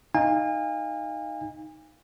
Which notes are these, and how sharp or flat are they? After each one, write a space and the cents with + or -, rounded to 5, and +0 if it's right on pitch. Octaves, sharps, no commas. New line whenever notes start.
D#4 +0 F5 +0 G#5 -35